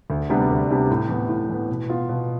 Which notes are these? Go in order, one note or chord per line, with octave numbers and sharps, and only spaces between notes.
D2
C3 G3 B3 D4
D2
C3 G3 B3 D4
A2
E3 B3
A2
E3 B3
B2
B3 F4
B2